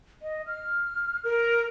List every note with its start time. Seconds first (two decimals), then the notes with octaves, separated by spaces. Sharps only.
0.22 D#5
0.47 F6
1.24 A#4